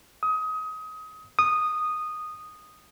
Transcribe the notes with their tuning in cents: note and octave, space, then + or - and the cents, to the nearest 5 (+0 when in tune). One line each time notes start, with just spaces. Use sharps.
D#6 +25
D#6 -10